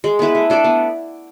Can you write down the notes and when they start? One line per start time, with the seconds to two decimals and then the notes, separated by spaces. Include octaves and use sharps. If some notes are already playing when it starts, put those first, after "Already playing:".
0.04 G#3
0.19 B3 E4 B4
0.35 A3
0.50 D4 A4 D5
0.64 B3